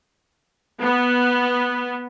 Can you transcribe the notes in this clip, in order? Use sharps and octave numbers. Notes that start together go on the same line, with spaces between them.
B3